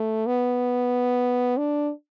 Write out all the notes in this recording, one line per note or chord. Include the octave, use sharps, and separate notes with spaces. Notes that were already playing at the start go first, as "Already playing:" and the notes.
Already playing: A3
B3
D4